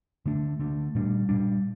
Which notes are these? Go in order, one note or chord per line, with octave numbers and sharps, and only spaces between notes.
D3 A3 D4
D3 A3 D4
A#2 G3 D4
A#2 G3 D4